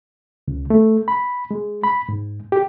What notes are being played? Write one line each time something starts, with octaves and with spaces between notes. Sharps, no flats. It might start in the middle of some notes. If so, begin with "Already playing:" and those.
C#2
A3
B5
G#3
B5
G#2
G4